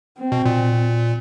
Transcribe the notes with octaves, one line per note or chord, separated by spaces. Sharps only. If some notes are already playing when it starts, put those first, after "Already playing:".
C4
B2
A#2